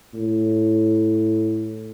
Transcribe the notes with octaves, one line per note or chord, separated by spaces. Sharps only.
A2